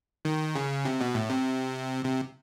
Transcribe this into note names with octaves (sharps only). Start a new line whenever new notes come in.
D#3
C#3
C3
B2
A2
C3
C3